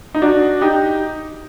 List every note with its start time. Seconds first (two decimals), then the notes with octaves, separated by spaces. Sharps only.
0.15 D#4
0.22 D4 F#4
0.61 D#4 G4